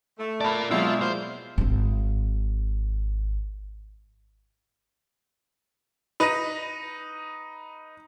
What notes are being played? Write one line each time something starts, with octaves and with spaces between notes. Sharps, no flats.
A3
A#4 D5 A5 B5
B2 F#3 G#3 C4 D4 E4 F4
A#3 C5
D#1 G#1
D#4 B4 B5 A#6